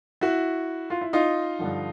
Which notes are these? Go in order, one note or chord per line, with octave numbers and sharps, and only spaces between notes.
E4 F#4
F4
E4
D#4 F4
G2 D3 F3